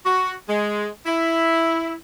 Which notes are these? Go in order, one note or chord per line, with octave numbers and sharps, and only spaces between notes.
F#4
G#3
E4